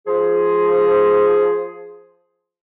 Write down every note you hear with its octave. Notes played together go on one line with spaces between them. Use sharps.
F3 G#4